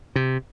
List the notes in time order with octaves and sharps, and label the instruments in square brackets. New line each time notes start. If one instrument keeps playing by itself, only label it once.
[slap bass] C3